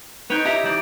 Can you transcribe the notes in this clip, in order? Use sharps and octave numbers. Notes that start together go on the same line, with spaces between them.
D#4 B4 C#5 G5 G6
E4 G4 A#5
E3 D5